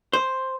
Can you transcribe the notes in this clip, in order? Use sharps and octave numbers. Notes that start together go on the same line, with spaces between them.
C5